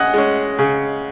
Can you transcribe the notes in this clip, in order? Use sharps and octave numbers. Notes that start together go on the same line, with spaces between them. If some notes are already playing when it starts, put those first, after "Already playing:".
Already playing: C#3 D#5 F#5 G#5
G#3 C#4
C#3